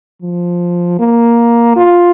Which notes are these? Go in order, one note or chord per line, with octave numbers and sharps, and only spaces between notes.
F3
A#3
F4